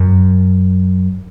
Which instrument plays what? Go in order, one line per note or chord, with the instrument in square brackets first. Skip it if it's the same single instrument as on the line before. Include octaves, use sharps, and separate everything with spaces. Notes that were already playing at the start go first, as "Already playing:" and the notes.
Already playing: [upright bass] F#2